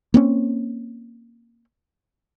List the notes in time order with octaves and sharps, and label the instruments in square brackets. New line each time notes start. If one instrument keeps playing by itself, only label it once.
[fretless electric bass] A#3 C4 C#4